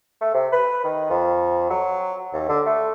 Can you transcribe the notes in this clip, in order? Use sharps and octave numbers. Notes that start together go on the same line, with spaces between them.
A3
C3
B4
D#3
F2
F#3
D#2
D3
A3